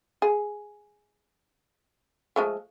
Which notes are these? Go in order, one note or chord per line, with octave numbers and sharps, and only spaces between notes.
G#4
F3 G#3 A3